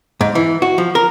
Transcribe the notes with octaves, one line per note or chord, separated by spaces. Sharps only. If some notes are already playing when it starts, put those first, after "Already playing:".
G#2
E3
F#4
F3
A#4